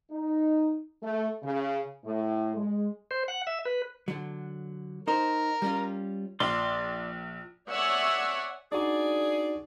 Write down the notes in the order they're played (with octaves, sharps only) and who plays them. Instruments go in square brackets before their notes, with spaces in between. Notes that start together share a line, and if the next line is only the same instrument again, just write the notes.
[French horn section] D#4
A3
C#3
A2
G#3
[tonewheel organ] C5
F#5
E5
B4
[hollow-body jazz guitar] D3 F#3
[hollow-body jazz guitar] D#4 C5 [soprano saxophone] A#4
[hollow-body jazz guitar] G3 C#4 F4
[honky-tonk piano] A#1 [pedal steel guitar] D5 C6 D6
[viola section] C#5 D5 E5 F#5 G#5
[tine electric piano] D4 D#4 F#4 [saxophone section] G#4 D5